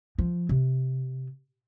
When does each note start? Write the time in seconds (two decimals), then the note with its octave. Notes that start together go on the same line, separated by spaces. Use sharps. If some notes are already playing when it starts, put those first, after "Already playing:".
0.18 F3
0.49 C3